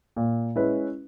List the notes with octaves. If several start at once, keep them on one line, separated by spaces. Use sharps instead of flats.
A#2
G#3 C#4 E4 B4